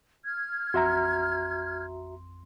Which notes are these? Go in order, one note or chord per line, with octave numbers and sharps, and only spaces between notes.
F6 G#6
A1 F2 F#4 E5 A#5 C6